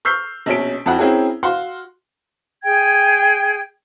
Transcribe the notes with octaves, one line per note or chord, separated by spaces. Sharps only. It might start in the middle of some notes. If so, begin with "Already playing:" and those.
C#6 E6 F6 G6 C7
A#1 B2 C#4 B6 D7
F2 E4 F#4 F#5
C4 C#4 E4 F#4 G#4 A#4
F#4 F5 F#5 C6
G#4 G5 G#6